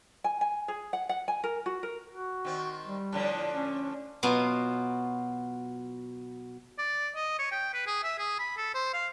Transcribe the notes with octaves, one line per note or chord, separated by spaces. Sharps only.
G#5
G#5
G#4
F#5
F#5
G#5
A#4
F#4
A#4
F#4
D#3 C4
G3
A2 D3 F3
C#4
B2 F#3 B3 F4
D5
D#5
C#5
G5
B4
G#4
E5
G#4
B5
A4
C5
F5